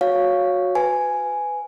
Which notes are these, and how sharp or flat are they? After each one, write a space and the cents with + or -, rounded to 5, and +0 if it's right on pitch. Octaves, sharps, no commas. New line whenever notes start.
F#4 -20 C#5 +0 F5 +0
B4 +25 G#5 +0